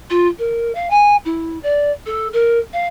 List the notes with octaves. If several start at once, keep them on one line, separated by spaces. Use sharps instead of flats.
F4
A#4
F5
G#5
E4
D5
A4
A#4
F5